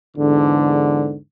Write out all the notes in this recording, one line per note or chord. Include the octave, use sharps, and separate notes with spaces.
E2 G#2 D3